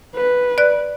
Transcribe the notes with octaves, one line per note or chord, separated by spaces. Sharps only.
B4
D5 F#6